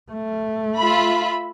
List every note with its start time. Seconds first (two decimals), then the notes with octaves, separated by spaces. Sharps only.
0.11 A3
0.78 F4 E5 B5